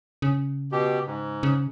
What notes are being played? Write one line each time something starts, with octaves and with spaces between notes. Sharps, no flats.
C#3
B2 G4
G#2
C#3